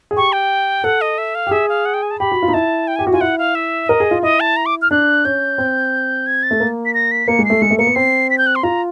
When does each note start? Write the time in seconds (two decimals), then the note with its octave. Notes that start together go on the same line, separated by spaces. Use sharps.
0.11 G#4
0.16 G4 C#6
0.33 G5
0.84 A4 F#5
1.01 D#5
1.18 E5
1.35 F5
1.47 G4
1.51 G#4 E5
1.69 F5
1.85 F#5
1.94 G5
2.02 G#5
2.11 A5
2.20 G4 B5
2.32 F#4
2.43 F4
2.48 D#4
2.54 E4 A5
2.88 G5
2.96 G4 G#5
3.07 F#4
3.13 F4 G#5
3.21 E4 F#5
3.38 F5
3.55 E5
3.89 A#4 D#5
4.00 G#4
4.11 F4
4.23 E4 D#5
4.40 A5
4.57 A#5
4.66 D6
4.82 F6
4.91 D4 F#6
5.25 C#4 G6
5.58 C4
6.27 G#6
6.43 A6
6.51 A3
6.60 A#3
6.86 B6
6.94 A#6
7.12 B6
7.28 A#3 C#7
7.39 G#3
7.45 A3 C7
7.62 G#3 C#7
7.71 A3
7.78 A#3 C#7
7.87 B3
7.95 C4 C7
8.30 B6
8.38 G6
8.47 F#6
8.56 C6
8.63 F4 A#5